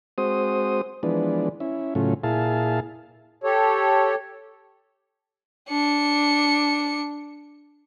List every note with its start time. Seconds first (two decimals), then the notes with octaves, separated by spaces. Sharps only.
0.18 G#3 C4 F#4 C5 D#6
1.03 E3 F3 G#3 B3 D4
1.60 C#4 E4
1.95 A2 C#3 F#3 A3 C#4 F4
2.24 A#2 E4 G#4 F5 A5
3.44 G4 A4 C#5
5.69 D4 C#7